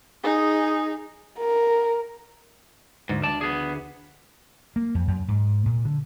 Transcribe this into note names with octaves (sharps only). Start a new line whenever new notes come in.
D#4 G#4
A#4
D2 G#2
D5 A5
B3 G#4
A#3
F2
F#2
G#2
A#2
D3